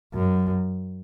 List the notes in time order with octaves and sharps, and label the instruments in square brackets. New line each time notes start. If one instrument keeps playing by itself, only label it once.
[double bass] F#2